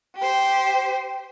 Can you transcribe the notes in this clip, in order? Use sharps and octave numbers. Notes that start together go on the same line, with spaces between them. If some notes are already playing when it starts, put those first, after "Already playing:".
G4 C5